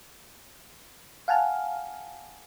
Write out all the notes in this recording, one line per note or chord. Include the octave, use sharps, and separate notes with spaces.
F5 F#5 G#5 A5 F6